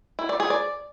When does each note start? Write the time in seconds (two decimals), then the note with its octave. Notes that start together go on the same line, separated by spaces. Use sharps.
0.19 E4
0.29 D5
0.40 G#4
0.50 D5